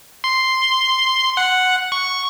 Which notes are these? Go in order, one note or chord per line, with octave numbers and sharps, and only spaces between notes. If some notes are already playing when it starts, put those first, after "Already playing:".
C6
F#5
C#6